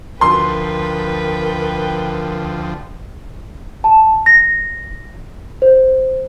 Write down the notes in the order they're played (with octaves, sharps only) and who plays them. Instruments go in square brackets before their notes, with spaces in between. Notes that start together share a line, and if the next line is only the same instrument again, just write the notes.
[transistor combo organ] D2 F3 [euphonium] A#4 [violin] B4 G5 [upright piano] C6
[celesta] A5
A#6
C5